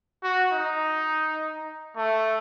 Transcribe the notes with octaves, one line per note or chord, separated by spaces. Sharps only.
F#4
D#4
A3